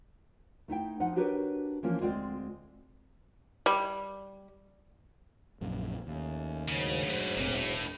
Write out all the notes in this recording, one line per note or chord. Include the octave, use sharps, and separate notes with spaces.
A3 D#4 E4 G5
F3 D#4 F#5
D4 F#4 G4 A#4 B4 C#5
E3 F3 A#3 C#4 F4
D2 G#3 C4 F4 D5 G5
G3
A#1 F#2 A#2
D#2 A3 C#4
D2 G#2 C#3 F#3
F#2 B2
F1 A#2 C4
E1 A2